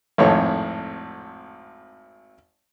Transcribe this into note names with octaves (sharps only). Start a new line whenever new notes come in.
G#1 F2 A2 C#5